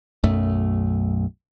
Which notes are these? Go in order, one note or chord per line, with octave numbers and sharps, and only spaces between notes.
B1 F#2 A3